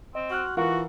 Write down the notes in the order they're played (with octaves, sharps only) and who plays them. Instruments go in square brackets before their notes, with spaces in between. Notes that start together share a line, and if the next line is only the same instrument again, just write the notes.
[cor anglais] C4 [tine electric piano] D#5
[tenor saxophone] F#4 [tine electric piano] C6 F6 F#6
[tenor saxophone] E3 [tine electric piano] F4 [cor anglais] F#4 [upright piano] A#4 F5 F#5